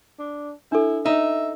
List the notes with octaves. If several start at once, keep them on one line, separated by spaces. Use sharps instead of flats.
D4
D4 E4 A4
D#4 E5